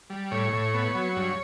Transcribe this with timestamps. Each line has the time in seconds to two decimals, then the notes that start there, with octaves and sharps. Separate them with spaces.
0.10 G3
0.31 A2 C#5
0.53 A2
0.74 B3
0.95 F#3
1.16 G2